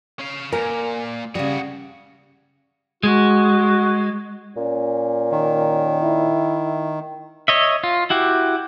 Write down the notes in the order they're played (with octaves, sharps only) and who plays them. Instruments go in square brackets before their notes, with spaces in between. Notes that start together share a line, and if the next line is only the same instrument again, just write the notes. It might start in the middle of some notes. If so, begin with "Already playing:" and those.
[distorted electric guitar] C#4 F5
[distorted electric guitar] A#2 [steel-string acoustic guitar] A#4 G#5
[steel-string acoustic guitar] C#3 G3 [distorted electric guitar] F#4 G#4
[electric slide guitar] G#3 [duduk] F#4
[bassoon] A#2 [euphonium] C#4
[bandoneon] D#3
[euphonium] E4
[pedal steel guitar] C#5 D#5 E5
F4
E4 F#4 G4